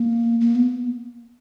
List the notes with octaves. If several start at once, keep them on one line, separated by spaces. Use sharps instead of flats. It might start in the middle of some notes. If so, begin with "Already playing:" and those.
Already playing: A#3
A#3
B3